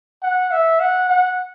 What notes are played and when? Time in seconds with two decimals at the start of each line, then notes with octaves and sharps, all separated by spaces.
0.22 F#5
0.52 E5
0.80 F#5
1.09 F#5